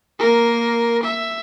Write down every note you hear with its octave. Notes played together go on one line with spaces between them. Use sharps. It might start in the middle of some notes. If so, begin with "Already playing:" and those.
A#3 A#4
E5